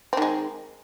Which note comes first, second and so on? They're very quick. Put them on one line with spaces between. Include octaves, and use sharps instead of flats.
C4 D#3 G#3